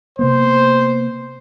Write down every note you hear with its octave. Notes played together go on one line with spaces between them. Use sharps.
C3 A#3 B3 C5